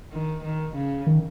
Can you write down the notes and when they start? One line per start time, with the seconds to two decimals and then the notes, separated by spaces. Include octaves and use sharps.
0.12 D#3
0.44 D#3
0.75 C#3
1.07 D#3